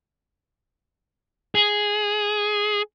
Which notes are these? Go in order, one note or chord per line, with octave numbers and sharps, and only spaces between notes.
G#4